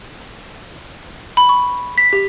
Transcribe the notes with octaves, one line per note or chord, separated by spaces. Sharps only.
B5
C#6
B6
G4